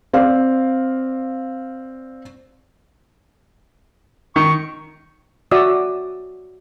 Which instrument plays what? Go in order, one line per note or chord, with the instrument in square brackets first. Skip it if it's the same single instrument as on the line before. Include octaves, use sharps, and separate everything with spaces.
[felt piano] C4 D5 F5
[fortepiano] D#3 [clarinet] C#6
[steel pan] F#4 D5 E5 D#6 E6